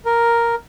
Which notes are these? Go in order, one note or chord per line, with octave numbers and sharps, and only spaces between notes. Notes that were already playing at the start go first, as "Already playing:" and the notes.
A#4